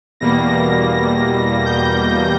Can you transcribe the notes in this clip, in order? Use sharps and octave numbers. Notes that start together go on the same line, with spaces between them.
E2 B2 G3 A#3 A#6
G6